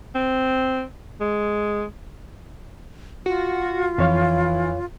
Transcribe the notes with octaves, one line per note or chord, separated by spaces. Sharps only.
C4
G#3
F4 F#4
F2 E3 C#5 F5